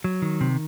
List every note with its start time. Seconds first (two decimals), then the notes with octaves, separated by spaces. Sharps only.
0.04 F#3
0.22 D#3
0.41 C3